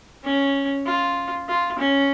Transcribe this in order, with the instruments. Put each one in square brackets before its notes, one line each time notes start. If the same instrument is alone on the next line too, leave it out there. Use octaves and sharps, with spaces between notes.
[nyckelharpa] C#4
F4
F4
C#4